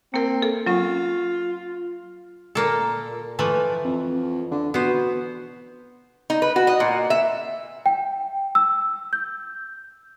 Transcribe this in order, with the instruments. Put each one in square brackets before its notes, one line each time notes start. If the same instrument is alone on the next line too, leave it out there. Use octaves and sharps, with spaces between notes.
[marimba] A#3 A#4 [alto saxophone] C4
[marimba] A4
[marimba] F#3 C#4 [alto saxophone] F4
[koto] A#2 A#3 A4
E3 F3 A3
[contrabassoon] F2
D3
[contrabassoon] B2 [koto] B3 C5
[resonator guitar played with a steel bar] D#4
B4
F#4
D#5
A#2
E5
[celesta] G5
E6
G6